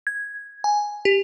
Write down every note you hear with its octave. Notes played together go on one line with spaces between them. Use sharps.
G#6
G#5
G4